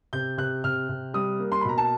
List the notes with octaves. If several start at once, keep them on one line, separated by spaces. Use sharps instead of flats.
C3 G6
C3 F#6
C3 F6
C3
G3 D#6
A#3
C6
B5
B2 A#5
A5